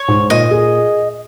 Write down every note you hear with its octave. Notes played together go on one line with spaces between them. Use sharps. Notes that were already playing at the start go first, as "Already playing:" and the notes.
Already playing: C#5
G#2
A#2 D#5
G#4